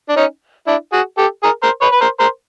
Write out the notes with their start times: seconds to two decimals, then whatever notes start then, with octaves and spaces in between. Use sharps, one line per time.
0.09 D4
0.16 C#4 D#4
0.67 D4 E4
0.92 F#4 G#4
1.18 G4 A4
1.43 G#4 A#4
1.63 A#4 C5
1.81 B4 C#5
1.92 B4
2.01 A#4 C5
2.20 A#4 C5